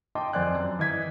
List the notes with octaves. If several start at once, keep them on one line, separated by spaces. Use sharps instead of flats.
D#5 G5 A5 C6 D6
F2 C5 D5 G#5 F#6
F#2
E3 D#5 G#6 B6